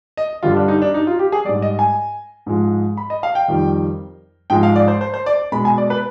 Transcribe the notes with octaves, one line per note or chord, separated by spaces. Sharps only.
D#5
G2 D3 G3 F4
D4
D#4
D4
D#4
F4
G4
G#4
G#2 G3 D5
D#5
G#5
G#2 F3 G#3
B5
D#5
F5
G5
F2 D#3 G3
G#2 F3 G#3 G5
F5
D5
C5
C5
C5
D5
B2 G#3 B5
G#5
D5
B4